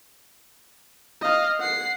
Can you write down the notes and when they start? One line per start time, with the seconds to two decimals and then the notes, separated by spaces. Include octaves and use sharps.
1.21 D#5 F5
1.60 F#5 C7